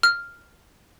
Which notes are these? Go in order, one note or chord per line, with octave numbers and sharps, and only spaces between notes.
F6